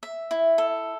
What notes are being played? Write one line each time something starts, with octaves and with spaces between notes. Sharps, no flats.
E5
E4
A4